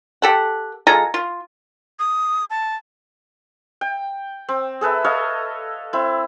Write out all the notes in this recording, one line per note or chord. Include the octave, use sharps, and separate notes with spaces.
G4 A4 F#5
G#3 F4 A4 A#5
F4
D#6
A5
G5
C4
G#4 A4 B4 E5
A4 C#5 D#5 F5
C4 E4